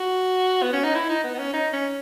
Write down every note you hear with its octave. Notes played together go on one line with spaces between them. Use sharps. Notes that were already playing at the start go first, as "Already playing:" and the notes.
Already playing: F#4
B3
C#4
D#4
E4
D#4
B3
B3
C#4
D#4
C#4